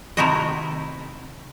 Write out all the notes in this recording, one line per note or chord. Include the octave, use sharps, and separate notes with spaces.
C3 D#3 A3 E4 F#4 D#5